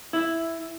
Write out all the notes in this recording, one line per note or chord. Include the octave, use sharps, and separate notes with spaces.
E4